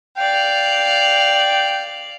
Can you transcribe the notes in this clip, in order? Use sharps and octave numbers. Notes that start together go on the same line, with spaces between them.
D5 F5 G5